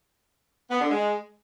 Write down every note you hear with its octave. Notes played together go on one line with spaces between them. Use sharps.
B3
D3
G#3